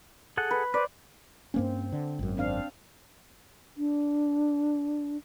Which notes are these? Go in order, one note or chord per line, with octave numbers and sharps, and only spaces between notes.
G#4 A4 F#5
B4
B4 C5 D5
G2 A#3 C4 C#4
D3
G#1 F#2
C4 D4 F5
D4